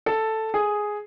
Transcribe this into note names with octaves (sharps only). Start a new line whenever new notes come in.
A4
G#4